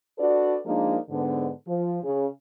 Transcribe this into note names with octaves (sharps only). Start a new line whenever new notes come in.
D4 F#4 A4 B4 D5
F3 G#3 A#3 D4 D#4 A#4
G#2 D3 B3
F3
C#3